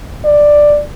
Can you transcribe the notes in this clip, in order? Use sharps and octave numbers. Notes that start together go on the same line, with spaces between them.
D5